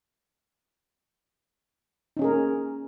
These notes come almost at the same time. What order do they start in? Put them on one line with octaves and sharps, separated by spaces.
D#4 C#4 G#4 A#4 A#3